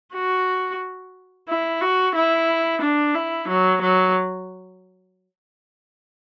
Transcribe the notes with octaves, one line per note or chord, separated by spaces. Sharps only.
F#4
E4
F#4
E4
D4
E4
F#3
F#3